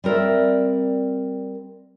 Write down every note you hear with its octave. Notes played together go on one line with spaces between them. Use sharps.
G3 C4 A#4 D5 E5